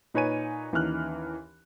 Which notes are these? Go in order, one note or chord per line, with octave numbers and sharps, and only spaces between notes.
A#2 D#4 B4 C#5 G#5 D#7
D#2 E3 C#4 D#4 F6 F#6